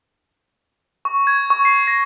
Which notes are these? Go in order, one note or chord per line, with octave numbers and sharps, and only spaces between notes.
C#6
G#6
C#6
C7
A#6